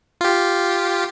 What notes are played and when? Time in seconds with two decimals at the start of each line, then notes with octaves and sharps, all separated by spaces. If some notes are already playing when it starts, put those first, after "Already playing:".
0.21 F4 G4